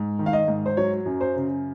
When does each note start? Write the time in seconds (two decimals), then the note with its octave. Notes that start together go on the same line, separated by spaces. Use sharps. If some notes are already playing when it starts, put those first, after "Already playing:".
Already playing: G#2
0.19 D#3
0.26 F5
0.33 D#5
0.48 G#2
0.66 C5
0.77 F#3 C#5
1.06 F#2
1.21 C5
1.36 C#3